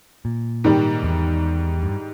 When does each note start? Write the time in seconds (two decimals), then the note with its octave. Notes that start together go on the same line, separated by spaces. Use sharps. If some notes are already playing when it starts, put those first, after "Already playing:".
0.25 A#2
0.64 G#2 D#3 G3
1.03 E2
1.83 G2